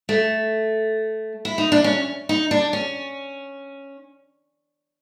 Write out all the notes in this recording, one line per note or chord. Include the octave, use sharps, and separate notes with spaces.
A3
E4
D#4
D4
C#4
D#4
D4
C#4